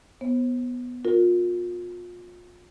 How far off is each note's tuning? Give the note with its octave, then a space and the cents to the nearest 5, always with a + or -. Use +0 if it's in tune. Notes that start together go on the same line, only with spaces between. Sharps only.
B3 +0 C5 +35
F4 +30 A#4 +0